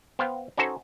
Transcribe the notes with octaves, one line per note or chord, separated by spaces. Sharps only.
B3 C5 F5 G5
C#4 D#4 F#4 A4 C5